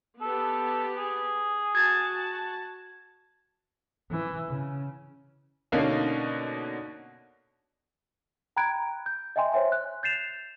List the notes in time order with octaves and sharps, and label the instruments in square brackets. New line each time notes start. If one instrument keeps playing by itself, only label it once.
[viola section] B3 G4 [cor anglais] A4
[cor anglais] G#4
[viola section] F#4 A5 [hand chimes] G#6 A6
[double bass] E3
C#3
[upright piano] B2 D3 A#3 C#4 D#4
[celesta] G5 A#5 B5 F#6 G#6 D7
G6
D#5 E5 G5 G#5 C6
C5 C#5 E5 G#5 C6
F#6
G6 A6 C7 E7 F7